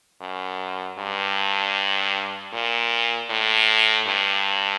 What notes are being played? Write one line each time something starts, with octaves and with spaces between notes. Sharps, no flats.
F#2
G2
A#2
A2
G2